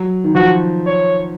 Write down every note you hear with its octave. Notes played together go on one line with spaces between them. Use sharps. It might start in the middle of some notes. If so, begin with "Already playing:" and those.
Already playing: F#3
D#3
F3 F#4
C#5